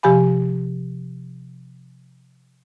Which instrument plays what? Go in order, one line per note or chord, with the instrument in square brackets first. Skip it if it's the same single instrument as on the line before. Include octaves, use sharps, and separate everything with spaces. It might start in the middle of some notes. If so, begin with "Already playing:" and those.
[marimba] C3 F3 G4 F5 G#5 B5